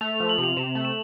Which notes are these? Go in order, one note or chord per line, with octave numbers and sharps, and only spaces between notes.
A3 F7
F3 F7
F#7
C3
F7
C3 E7
A3
E7